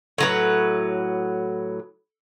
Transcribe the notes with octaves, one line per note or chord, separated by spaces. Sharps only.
A2 F#3 B4